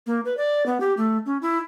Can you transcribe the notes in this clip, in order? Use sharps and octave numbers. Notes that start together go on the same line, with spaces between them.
A#3
B4
D5
B3
G4
A3
C#4
E4